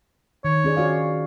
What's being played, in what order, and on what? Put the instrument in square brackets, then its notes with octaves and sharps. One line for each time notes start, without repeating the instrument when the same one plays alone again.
[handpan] D#3 [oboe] C#5
[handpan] C#4 G#4 D5
F#4 D5 F5